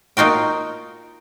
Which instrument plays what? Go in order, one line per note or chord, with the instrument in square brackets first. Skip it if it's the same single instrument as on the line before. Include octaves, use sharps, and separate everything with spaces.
[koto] A#3 D#4 F4 F#4 G5